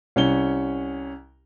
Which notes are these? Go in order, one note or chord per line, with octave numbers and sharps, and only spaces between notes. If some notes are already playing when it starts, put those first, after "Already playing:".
C2 C#4 G7